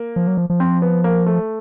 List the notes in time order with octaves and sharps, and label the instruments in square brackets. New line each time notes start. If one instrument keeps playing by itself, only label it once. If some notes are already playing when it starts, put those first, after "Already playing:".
Already playing: [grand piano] A#3
[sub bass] F3
F#3
F3
F3
[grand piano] C4
B3
A#3
A3